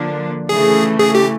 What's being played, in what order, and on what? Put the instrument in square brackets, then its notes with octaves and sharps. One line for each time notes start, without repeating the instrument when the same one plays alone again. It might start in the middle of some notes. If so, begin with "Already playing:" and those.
Already playing: [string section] D3 F3 A#3 D4
[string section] C#3 E3 A3 [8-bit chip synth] G#4
[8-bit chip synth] G#4
G4